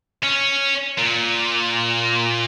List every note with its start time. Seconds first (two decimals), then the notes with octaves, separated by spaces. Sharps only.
0.23 C#4
0.98 A#2